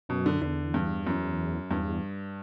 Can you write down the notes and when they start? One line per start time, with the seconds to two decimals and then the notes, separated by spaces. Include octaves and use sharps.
0.09 F#2 B2
0.26 D3
0.42 E2 D3
0.74 G2
1.07 F#2
1.70 E2 G2